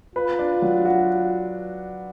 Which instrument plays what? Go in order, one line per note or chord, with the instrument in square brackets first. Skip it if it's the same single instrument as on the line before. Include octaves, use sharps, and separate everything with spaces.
[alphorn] F4 [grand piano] B4
[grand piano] D4
F#3
F#4